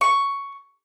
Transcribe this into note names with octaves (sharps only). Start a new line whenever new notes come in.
C#6